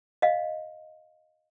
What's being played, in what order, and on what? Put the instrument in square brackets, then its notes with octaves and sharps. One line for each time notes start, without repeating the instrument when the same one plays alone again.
[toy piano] D#5 F5